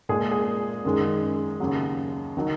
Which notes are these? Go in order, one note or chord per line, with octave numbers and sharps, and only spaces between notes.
A#2 G#3 G#4
G#4
F#2 D#3 G#3
D#2 C#3 F#3
D#3 F#3